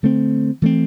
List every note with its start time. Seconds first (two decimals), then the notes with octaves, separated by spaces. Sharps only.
0.03 D3 A3 C4
0.62 E3 A3 C4